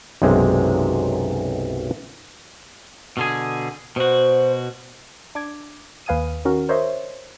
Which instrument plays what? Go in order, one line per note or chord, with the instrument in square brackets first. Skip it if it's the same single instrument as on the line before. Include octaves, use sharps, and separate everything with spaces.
[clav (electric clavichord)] B1 F#2 C3 G#3
[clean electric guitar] B2 D3 G#4
[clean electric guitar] B2 F#4 [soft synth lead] C5
[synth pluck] D4 D6 G#6
D#2 B4 F5 G#5 D#6 D#7
D#3 C#4 F#4 A#4
A#4 C5 C#5 D#5 E5 C6